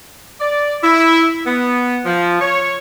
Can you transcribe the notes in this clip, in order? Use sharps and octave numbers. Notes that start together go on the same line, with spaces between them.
D5
E4
B3
F3
C#5